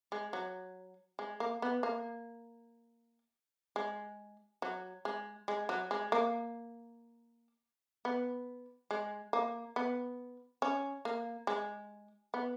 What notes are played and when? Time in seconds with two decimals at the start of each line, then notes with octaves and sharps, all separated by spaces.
0.12 G#3
0.33 F#3
1.19 G#3
1.40 A#3
1.62 B3
1.83 A#3
3.76 G#3
4.62 F#3
5.05 G#3
5.48 G#3
5.69 F#3
5.91 G#3
6.12 A#3
8.05 B3
8.91 G#3
9.33 A#3
9.76 B3
10.62 C#4
11.05 A#3
11.47 G#3
12.34 B3